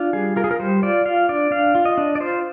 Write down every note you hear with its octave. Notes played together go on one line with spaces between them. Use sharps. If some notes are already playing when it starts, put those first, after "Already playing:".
Already playing: D4 F4
G3 G#4
F4 A#4
G#4
A#4
G3 C5
F4 D5
F4 F5
D4 D5
D4 F5
F4
D#5
D4
D5
F4 C5